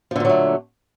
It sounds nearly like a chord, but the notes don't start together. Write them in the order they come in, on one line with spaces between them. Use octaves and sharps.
F3 D3 A#2 F#3 A3